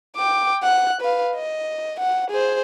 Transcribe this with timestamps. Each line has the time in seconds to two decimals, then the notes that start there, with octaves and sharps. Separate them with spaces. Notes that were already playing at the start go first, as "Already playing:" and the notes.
0.16 G5 D6
0.62 F#5 F#6
1.01 B4 F5
1.35 D#5
2.00 F#5
2.31 G#4 C5